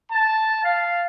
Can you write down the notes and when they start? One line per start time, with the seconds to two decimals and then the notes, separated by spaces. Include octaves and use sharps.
0.12 A5
0.64 F5